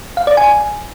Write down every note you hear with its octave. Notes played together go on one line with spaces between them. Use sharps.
F5
D5
G#5